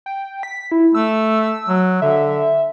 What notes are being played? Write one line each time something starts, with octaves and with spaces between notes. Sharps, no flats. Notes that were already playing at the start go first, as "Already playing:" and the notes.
G5
B6
E4
A3 E6
F#3
D3 E5